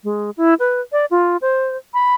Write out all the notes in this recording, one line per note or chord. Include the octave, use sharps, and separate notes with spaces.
G#3
E4
B4
D5
F4
C5
B5